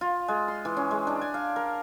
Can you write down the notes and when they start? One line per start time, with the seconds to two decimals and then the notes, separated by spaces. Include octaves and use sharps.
0.01 F4
0.28 G#3
0.48 C6
0.65 E3
0.77 C#4
0.91 G#3
1.07 D4
1.21 G#5
1.34 F5
1.56 A#4